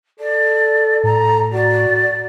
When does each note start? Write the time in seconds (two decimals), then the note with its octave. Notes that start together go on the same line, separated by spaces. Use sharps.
0.19 A4 D5
1.03 A2 A#5
1.53 F#4 D5